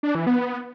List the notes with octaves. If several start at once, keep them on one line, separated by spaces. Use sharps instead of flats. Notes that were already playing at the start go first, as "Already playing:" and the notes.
D4
E3
B3